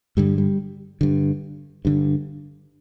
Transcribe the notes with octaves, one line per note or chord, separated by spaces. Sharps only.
G2 D3 G3
G3
G2 D3
G2 D3